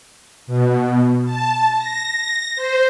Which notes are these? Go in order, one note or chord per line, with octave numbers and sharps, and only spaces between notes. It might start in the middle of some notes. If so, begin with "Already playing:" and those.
B2
A5
A#6
C5